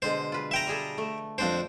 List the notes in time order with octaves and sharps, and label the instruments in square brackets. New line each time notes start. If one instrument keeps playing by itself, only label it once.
[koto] B2 D3 G#3 [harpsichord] C5
[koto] F4 B4
[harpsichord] E5 G5 A#5
[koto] G3 G#4 A4
A3
[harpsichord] F2 D4 C5 [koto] G5